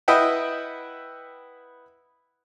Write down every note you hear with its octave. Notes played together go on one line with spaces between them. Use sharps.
E4 B4 D#5 E5 F#5 G5